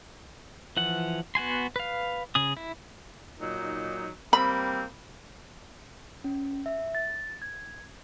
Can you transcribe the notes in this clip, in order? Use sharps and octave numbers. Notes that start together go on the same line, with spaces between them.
E3 F3 F#5
B3 F#4 G#5 C6
B4 F5
C#3 G#4 D#6
E4
A#2 F#3 D#4
G3 A#3 C4 B5
C#4
E5
A6
G#6